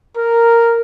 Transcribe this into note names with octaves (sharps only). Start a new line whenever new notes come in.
A#4